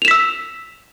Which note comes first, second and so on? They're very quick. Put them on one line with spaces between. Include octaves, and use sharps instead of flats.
F7 E7 B6 E6